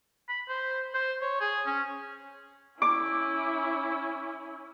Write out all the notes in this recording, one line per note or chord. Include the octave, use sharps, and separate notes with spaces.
B5
C5
C5
C#5
G#4
C#4
C#4 E4 D6